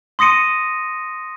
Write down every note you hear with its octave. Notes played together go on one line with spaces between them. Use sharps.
C6 D#6 A#6 C#7 D#7